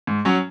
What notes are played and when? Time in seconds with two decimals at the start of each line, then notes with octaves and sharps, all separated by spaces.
0.07 G#2
0.25 F#3 C#4